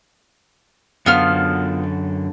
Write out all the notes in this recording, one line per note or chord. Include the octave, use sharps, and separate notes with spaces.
F#2 D3 B3 F4 A4 F6